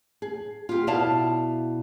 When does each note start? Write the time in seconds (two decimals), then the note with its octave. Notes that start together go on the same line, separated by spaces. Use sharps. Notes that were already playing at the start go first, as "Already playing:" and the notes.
0.22 G#4
0.69 F4 G4
0.87 B2 E4 D5 F5 A5